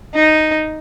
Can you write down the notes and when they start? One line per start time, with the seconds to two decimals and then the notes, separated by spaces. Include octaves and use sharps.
0.16 D#4